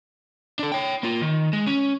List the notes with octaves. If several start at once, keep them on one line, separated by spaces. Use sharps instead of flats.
D4 A4
C#5 G5
A#3 F4
D#3
G#3
C#4